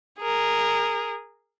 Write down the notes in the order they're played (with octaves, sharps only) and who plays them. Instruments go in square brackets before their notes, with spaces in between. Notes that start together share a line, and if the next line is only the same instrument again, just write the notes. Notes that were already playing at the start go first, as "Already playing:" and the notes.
[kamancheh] G#4 A#4